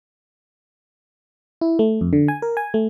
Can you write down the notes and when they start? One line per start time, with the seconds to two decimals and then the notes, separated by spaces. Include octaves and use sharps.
1.61 E4
1.79 A3
2.01 F2
2.13 D3
2.28 G#5
2.42 A#4
2.57 G#5
2.74 A3